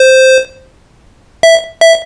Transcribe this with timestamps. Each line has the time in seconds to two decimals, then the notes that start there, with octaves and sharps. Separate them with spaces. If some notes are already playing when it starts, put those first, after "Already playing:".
Already playing: C5
1.43 E5
1.81 E5